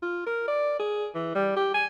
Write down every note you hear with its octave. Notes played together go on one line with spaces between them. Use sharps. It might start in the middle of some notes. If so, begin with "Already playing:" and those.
F4
A#4
D5
G#4
E3
G3
G4
G#5